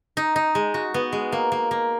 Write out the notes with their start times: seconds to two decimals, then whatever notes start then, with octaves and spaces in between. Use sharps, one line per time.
0.17 D#4
0.36 D#4
0.55 G#3
0.74 F#4
0.94 B3
1.12 G#3
1.32 A#3
1.52 A#3
1.71 A#3